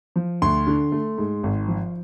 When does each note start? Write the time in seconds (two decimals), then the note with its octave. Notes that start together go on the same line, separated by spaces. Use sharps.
0.16 F3
0.42 D2 C6
0.67 D3
0.92 A3
1.18 G#2
1.43 G#1
1.68 F3